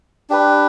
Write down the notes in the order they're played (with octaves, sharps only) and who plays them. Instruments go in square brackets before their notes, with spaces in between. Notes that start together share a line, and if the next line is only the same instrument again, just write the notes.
[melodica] D4 G4 B4